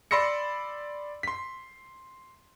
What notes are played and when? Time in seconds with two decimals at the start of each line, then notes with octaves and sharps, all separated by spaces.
0.11 D5 B5 C6 E6 A#6 C#7
1.23 C6 B6